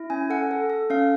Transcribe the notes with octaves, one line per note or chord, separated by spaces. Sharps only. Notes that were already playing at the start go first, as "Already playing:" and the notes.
Already playing: E4
C#4 G#5
A4 F#5
A4
A4
C#4 F5